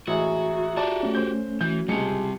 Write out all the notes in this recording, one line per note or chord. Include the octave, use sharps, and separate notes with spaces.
A1 G#3 F#4 G#4 E5 A#5
F#4 G4 D5 A5
A3 C#4
C5 G6
E3 F#4 G6
C#2 G3 G#3 C4 G4 A5 C#7